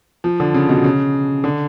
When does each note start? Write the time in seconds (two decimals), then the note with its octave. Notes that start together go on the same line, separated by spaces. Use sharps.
0.24 F3
0.40 D3
0.54 C#3
0.69 B2
0.84 C#3
1.44 D3